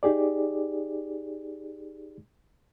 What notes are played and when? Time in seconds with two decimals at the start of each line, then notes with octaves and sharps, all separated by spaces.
0.03 D#4 G4 G#4 D5